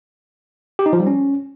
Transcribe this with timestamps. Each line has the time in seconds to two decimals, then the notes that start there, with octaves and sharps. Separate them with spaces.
0.79 G4
0.86 D#4
0.93 F3
1.00 G3
1.07 C#4